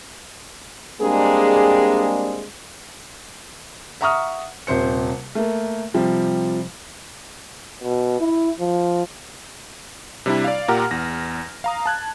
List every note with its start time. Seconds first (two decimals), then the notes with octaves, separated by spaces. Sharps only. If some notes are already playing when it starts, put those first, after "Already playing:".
1.01 G3 G#3 A#3 C4 D4 G#4
4.01 E5 F#5 A#5 C#6 D#6 F6
4.67 D#1 C3 C5 C#7
5.35 A3 A#3
5.94 C3 F3 G3
7.83 B2
8.21 E4
8.60 F3
10.26 C3 G3 D4 E4
10.44 D5 F5
10.68 A#2 G4 A#4 F#5 A#5 F6
10.91 E2 A#6
11.64 F5 A#5 D#6
11.86 A5 F#6 G#6